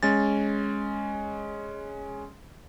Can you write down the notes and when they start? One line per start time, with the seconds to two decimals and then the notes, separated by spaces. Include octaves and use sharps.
0.03 G#3 C#4 A6